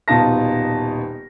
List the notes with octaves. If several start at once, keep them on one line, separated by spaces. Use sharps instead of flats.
D#1 B2 D#4 F4 A5 A#6